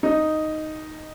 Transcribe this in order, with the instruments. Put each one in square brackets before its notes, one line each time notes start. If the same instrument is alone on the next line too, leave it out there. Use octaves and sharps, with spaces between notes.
[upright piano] D#4